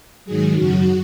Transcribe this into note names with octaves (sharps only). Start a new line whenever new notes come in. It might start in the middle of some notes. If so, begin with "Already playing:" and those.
G#2 D#3 F#3 G#4
F#2 C#3 F#3 F#4